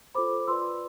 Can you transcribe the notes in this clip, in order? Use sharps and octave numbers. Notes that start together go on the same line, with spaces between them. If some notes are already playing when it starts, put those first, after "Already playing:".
F4 A4 C5 B5 D6
F4 B4 D5 C6 E6